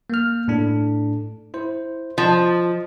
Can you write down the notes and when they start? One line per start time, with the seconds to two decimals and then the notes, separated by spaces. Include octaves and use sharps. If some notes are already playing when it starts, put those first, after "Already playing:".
0.10 A#3 F6
0.48 A2 D4 A4
1.54 E4 C5
2.18 F3 D#5